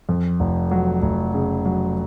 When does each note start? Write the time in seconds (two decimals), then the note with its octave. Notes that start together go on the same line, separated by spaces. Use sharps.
0.09 F2
0.40 F1
0.71 F#3
1.02 F1
1.34 C#3
1.65 F#3